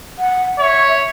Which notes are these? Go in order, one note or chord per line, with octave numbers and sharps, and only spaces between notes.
F#5
C#5 E5